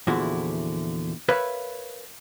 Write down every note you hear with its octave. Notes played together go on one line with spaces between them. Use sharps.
E2 A#2 D3 F3 E4 F#4
A#4 B4 C#5 E5 F5 B5